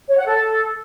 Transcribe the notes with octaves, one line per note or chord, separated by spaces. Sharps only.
C#5
F#5
A4